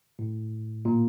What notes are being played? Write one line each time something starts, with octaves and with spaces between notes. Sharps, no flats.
A2
A#2